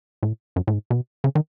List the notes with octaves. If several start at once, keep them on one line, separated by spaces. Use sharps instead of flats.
A2
F#2
A2
G#2
B2
C#3
D#3